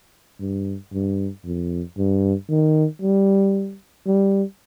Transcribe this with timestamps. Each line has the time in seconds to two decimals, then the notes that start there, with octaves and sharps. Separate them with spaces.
0.40 G2
0.93 G2
1.45 F2
1.97 G2
2.49 D#3
3.02 G3
4.06 G3